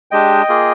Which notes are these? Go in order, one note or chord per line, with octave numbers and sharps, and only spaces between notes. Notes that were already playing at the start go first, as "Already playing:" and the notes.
G#3 D4 G4 D#5 G5
A#3 F4 G#4